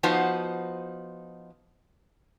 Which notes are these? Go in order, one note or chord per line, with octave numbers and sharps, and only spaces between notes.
F3 B3 D#4 F#4 C5